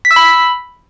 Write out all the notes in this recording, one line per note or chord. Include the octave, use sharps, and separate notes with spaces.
B6
E6
B5